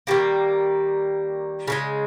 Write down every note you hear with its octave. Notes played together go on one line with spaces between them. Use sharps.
D#3 G3 A#3
C#3 E3 G#3